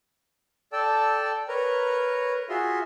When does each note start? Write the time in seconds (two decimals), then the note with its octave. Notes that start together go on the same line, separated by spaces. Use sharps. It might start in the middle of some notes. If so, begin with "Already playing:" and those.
0.73 A4 D5 G5 A5 E6
1.48 A#4 B4 C#5 A#5
2.49 F4 F#4 G#4 E5 C6